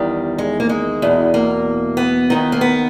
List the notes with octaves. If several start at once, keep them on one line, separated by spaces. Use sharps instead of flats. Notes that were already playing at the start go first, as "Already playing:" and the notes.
Already playing: E2 D#3 G3
G#3
A#3
G#3
E2 B2
A#3
B3
D#2 D#3
A#3
B3